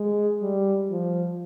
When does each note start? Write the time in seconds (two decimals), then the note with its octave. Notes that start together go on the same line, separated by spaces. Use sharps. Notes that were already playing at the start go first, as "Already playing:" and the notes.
Already playing: G#3
0.42 G3
0.91 F3